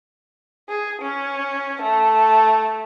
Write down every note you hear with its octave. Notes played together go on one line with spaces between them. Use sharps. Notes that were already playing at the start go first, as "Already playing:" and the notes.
G#4
C#4
A3